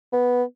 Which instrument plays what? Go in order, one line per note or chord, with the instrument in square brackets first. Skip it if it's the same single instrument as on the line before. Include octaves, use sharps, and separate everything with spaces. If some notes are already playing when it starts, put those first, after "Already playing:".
[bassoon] B3